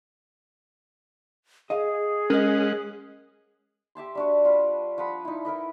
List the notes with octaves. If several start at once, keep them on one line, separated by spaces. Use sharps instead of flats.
G#4 D#5 F5
G#3 C#4 A#4 D#5 F#5
G4 E5 A5 C6
G3 D4 F#4
G3 F4 B4
F3 F#5 B5
D#4 E4
E4 A#4 B4 D#5